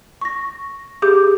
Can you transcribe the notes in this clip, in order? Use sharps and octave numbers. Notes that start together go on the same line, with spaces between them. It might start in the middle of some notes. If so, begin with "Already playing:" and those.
C#6 A#6
G4 G#4 D6 G6